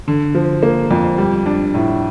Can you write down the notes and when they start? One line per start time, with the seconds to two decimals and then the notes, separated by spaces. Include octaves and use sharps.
0.08 D3
0.35 F3
0.63 A#3
0.91 F2
1.18 G3
1.46 D4
1.74 A2